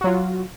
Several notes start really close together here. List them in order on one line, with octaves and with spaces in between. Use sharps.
F#4 F#3 F4